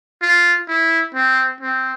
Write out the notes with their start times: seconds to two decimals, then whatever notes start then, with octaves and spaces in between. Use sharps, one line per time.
0.22 F4
0.68 E4
1.15 C4
1.61 C4